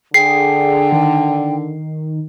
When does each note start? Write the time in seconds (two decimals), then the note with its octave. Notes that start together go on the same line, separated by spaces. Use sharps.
0.14 D3 G#4 G5 C7
0.92 D#3